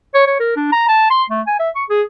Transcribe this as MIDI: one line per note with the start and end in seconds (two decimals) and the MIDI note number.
0.14 0.27 73
0.27 0.35 73
0.40 0.52 70
0.56 0.72 62
0.72 0.84 82
0.88 1.10 81
1.10 1.24 84
1.30 1.41 57
1.47 1.58 80
1.59 1.70 76
1.75 1.84 85
1.89 2.02 68